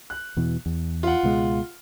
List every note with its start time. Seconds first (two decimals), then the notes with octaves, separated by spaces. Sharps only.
0.10 F#6
0.37 E2 B2 E3
0.66 E2
1.03 F4 F#5
1.23 C#2 B2 G#3